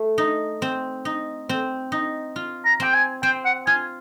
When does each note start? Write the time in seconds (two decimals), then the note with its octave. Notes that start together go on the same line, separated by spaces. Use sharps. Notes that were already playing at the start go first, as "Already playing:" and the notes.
Already playing: A3
0.18 D#4
0.62 C4
1.05 D#4
1.49 C4
1.92 D#4
2.36 F4
2.65 A#5
2.80 C4 G5
2.94 G#5
3.23 C4 G5
3.45 F#5
3.67 F4 G#5